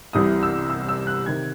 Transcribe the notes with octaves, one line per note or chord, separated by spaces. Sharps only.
C2 C3 E3 D#6
E6
E6
E6
F#6
C3 D#3 G#6